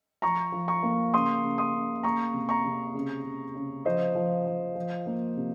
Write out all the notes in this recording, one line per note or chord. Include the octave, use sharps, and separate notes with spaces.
F3 A#5 C#6
F3
A#5 C#6
A#3
C#3 C6 D#6
C#3
C6 D#6
C#3
A#3 A#5 C#6
C3
A#5 C#6
C3
C#3
C#3
C#3
F3 C5 D#5
F3
F3
F3
A#3
C3